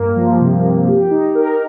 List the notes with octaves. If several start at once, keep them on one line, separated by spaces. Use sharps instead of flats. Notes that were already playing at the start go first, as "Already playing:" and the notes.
Already playing: G2 A#3
F3
C3
C3
G4
D#4
A#4